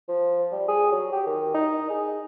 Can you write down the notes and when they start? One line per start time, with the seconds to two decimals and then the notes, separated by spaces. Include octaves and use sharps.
0.08 F3
0.52 G3
0.68 G#4
0.92 F#3
1.12 G4
1.26 D#3
1.54 D#4
1.90 G#4